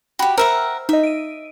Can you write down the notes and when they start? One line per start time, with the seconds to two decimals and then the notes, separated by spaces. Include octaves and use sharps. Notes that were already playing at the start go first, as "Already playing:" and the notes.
0.19 F#4 G4 G5 B5
0.38 A#4 C5 E5 F#5 E6 F6
0.89 D#4 D#5 E5
1.03 D7 D#7